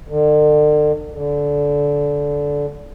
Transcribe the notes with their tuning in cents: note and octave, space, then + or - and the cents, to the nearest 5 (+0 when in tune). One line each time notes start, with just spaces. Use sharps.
D3 +40
D3 -20